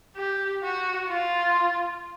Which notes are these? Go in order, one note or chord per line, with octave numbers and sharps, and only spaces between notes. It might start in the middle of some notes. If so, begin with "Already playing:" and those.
G4
F#4
F4